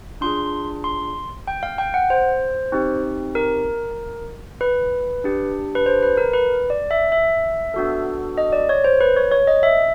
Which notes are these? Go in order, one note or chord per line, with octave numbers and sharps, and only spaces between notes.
D4 F4 G#4 C6
C6
G5
F5
G5
F#5
C5
C4 D#4 G4
A#4
B4
D4 G4
B4
C5
B4
A#4
B4
D5
E5
E5
B3 D4 F#4 A4
D#5
D5
C#5
C5
B4
C#5
C#5
D#5
E5